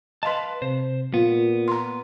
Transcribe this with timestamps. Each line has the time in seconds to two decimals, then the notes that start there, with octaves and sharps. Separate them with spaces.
0.23 B4 D#5 F5 A5 C6
0.62 C3 C5
1.14 A#2 B3 F4
1.68 A#5 C6